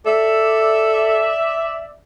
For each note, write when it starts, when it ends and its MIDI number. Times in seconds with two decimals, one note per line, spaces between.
0.06 1.30 69
0.06 1.95 74
0.06 1.95 76